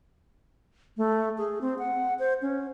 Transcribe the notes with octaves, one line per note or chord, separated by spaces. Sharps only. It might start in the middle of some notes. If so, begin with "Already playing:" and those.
A3
G#4
C4
F#5
C5
C#4